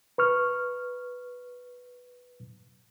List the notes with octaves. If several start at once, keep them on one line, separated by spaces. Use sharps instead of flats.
B4 C#6 F6